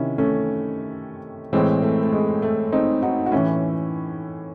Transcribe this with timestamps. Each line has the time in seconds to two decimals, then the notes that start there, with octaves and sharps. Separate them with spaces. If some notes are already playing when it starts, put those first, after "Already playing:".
Already playing: C3 D#3 C#4 E4
0.18 A3 C#4
1.53 A2 E3 G#3 C4
1.82 A3
2.03 A3
2.12 G#3
2.42 A3
2.72 C4 D#4
3.03 D#4 F#4
3.26 F#4
3.32 A2 E3 C#4 E4